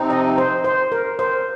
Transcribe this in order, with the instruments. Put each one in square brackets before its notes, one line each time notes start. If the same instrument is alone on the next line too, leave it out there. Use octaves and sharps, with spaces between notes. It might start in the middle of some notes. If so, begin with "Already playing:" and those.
Already playing: [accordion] C3 F3 C4 D#4
[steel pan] D#5
C5
C5
A#4
C5